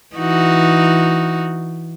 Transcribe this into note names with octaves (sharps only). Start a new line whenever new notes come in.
E3 D#4 F#4